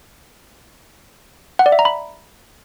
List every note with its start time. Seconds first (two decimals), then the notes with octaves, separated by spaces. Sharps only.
1.59 F#5
1.66 D5
1.72 E5
1.79 A#5
1.85 B5